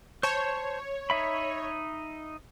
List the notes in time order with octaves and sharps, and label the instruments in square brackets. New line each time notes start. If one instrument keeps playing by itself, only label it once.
[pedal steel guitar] C5 A5 [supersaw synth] C#5
[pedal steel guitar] D#4 E5 B5